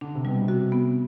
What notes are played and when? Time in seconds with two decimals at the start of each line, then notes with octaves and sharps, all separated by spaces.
0.01 D3 D4
0.15 C3
0.25 B2 G3
0.42 C3
0.48 F#4
0.72 B3